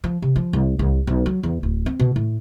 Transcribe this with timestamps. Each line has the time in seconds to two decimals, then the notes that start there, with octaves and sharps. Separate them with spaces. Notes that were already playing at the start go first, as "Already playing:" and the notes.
0.04 F3
0.22 C3
0.36 F3
0.53 C2
0.79 C2
1.07 B1
1.26 F#3
1.43 E2
1.63 D1
1.86 C4
1.99 B2
2.16 A2